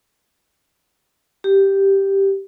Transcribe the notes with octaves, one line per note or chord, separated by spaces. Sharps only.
G4